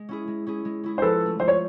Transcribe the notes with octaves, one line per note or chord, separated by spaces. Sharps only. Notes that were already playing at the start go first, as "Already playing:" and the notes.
Already playing: G#3
C#4 E4 G#4
G#3
C#4 E4 G#4
G#3
C#4 E4 G#4
C5
F3 A4 B4
C#4
A3
F3 C5
C#5